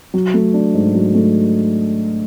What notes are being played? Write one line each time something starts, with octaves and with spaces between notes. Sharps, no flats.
F#3
A3
D4
G#2
F#3
A3